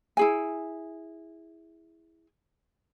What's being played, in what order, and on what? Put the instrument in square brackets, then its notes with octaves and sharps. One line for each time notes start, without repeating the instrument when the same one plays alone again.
[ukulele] E4 G#4 G#5